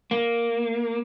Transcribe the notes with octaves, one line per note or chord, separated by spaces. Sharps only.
A#3